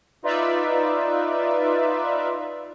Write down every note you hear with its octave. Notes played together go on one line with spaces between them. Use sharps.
D#4 F4 B4 D5 E5